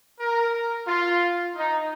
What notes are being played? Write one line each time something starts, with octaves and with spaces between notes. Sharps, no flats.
A#4
F4
D#4